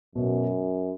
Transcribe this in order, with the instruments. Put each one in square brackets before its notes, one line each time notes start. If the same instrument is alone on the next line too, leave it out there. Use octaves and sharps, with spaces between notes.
[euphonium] F#2 [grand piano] B2